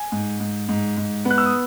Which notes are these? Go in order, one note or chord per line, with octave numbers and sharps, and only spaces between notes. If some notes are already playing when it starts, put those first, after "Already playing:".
Already playing: G#5
G#2
G#2
G#2
G#2
B3
F#6
E6
D#6